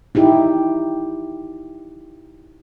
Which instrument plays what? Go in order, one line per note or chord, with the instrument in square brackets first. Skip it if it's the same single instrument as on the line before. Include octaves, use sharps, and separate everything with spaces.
[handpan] D#4 E4 G4